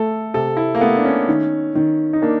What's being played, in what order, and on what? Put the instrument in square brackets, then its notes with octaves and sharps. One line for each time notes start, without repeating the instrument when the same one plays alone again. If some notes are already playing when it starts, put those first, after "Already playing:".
Already playing: [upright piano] A3 [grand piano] A4
[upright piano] C3 [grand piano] A4
[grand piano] E4
A#3
[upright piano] A3 [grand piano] B3
[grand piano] D4
C#4
[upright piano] D#3
D#3
[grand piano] D#4
[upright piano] A#3 [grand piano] D4